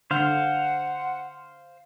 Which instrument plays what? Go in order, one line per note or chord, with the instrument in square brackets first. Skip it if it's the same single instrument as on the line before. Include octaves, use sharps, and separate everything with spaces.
[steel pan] D3 [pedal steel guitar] C5 F5 [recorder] F#5